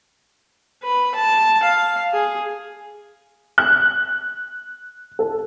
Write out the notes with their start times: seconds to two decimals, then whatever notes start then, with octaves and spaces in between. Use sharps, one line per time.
0.83 B4
1.15 A5
1.63 F5
2.13 G#4
3.58 F#6
5.19 A4